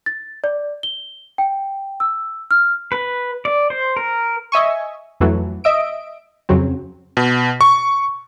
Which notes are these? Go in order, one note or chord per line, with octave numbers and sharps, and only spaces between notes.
A6
D5
G7
G5
E6
F6
B4
D5
C5
A#4
D#5 E5 G#5 C#6
F2 E3 F#3 A3
D#5 E5 D7
F2 C#3 F#3 C4
B2
C#6